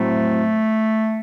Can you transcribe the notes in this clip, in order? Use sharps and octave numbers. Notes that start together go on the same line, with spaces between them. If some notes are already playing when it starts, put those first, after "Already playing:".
Already playing: A2 F#3 A3 C4